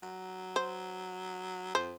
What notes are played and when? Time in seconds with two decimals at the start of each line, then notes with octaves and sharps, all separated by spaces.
0.03 F#3
0.56 C5
1.75 F2 C5